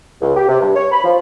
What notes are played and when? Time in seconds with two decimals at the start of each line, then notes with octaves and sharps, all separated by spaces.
0.21 C#2
0.37 G4
0.48 C3
0.60 G2
0.75 C#5
0.92 B5
1.04 F3